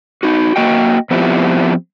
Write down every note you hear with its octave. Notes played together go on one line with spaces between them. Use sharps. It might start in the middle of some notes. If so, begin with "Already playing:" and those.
D#4 F#4
A#3 F#4 D#5 G5
F3 B3 C4 E4 F4 G4